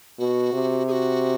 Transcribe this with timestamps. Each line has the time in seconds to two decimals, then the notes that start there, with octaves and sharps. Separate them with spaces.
0.19 B2 F#4
0.53 C3
0.87 G#4
0.91 F#4